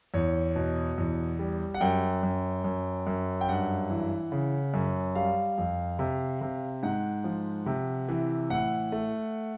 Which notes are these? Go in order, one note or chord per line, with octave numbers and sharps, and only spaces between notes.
E2 C#5
B2
E2
G3
F#5
F#2 G5
F#2
F#2
F#2
G5
G2 F#5
E3
C#3
F#2
G3 F5
F2
C3
C3
G#2 F#5
F3
C3
E3
A2 F#5
A3